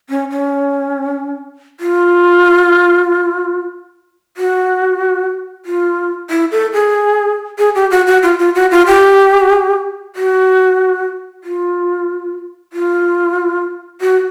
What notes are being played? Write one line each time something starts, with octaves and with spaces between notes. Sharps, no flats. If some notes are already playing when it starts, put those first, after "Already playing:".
C#4
C#4
F4
F#4
F4
E4
A4
G#4
G#4
G4
F#4
F#4
F4
F4
F#4
F4
G4
F#4
F4
F4
F#4